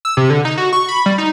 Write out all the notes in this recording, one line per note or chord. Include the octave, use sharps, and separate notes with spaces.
E6
C3
D3
D#4
F#4
C#6
B5
G3
D#4